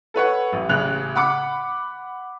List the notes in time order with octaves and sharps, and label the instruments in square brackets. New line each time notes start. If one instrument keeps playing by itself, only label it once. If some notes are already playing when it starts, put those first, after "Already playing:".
[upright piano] A4 B4 C#5 F#5
A1
A1 C#3 F#6 F7
F#5 B5 D6 C#7